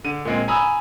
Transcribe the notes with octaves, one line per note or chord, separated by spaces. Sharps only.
D3 D#7
A#2 G#3 C4
G#5 A#5 B5 D#6 E6